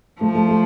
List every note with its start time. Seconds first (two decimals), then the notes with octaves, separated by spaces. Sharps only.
0.20 F3 A3
0.35 A3
0.49 A3